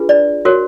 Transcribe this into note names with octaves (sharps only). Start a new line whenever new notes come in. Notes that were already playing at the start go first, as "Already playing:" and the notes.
Already playing: D4 F4 G#4 B4
D5
F#4 A#4 C#5